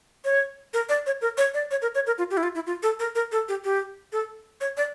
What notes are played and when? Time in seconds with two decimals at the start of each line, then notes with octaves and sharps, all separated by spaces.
0.25 C#5
0.73 A#4
0.89 D5
1.06 C#5
1.21 A#4
1.38 C#5
1.54 D5
1.71 C#5
1.82 A#4
1.95 C#5
2.07 A#4
2.18 F4
2.31 G4
2.37 E4
2.43 F4
2.55 E4
2.67 F4
2.83 A4
3.00 A#4
3.15 A#4
3.32 A4
3.48 G4
3.64 G4
4.12 A4
4.61 C#5
4.77 D5